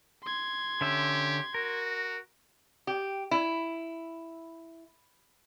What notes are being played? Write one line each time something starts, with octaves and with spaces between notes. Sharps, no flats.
C6 G#6
D3 C#4 G4 E5
F#4 A#4
G4
E4